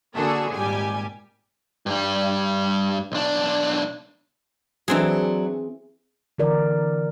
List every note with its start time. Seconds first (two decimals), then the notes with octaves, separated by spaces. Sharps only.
0.15 D3 A#3 D4 F#4 G#4 A4
0.54 G#1 A#2 G3 G4 G#5
1.86 G2 G3
3.12 B1 D4
4.88 E3 F#3 C4 D4 G#4
6.38 D3 E3 A#4 D5